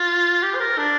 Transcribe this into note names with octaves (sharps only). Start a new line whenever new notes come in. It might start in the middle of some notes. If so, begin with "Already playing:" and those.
Already playing: F4
G4
C5
A#4
D4